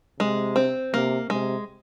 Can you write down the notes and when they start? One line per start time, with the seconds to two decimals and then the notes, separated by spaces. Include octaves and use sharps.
0.19 C3 G#3
0.56 C4
0.93 C3 A#3
1.30 C3 G#3